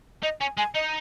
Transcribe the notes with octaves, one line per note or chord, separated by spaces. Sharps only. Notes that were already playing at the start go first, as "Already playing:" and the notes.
D#4 D#5
C#4 G#5
G#3 G#5
D#4 D#5